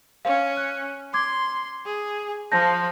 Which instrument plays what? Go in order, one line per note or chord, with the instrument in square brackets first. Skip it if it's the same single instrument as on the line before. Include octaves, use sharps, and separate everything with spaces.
[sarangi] C#4 [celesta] F5
[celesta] F#6
[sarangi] C6 [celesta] D6 G#6
[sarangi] G#4
[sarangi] F3 [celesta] A5 G6 A#6